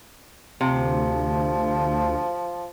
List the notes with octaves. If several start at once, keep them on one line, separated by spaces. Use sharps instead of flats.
D2 C3 F3